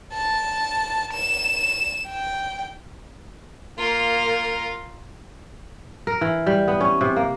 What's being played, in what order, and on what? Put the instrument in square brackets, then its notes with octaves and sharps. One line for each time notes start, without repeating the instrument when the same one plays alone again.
[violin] A5
E7
G5
[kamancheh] A#3 [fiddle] F4 A#4
[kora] A#4
E3
G3
B3
C#4
C3
A#3